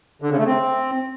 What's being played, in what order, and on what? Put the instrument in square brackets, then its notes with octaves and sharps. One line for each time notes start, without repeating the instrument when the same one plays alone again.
[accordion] D3
C#3
A3
C4